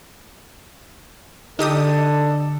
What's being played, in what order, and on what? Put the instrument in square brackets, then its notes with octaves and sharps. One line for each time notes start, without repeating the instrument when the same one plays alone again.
[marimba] D3 [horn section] D4 A4 [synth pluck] D#4 G4 D#6